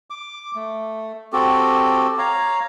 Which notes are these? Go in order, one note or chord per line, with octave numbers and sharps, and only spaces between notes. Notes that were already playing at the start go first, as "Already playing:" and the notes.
D6
A3
C4 F#4 G4 A4
C#5 F5 A#5